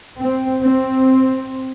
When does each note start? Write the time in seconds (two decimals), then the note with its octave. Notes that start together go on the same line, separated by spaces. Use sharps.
0.19 C4
0.62 C4